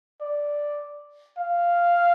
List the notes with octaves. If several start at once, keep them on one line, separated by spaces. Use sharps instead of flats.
D5
F5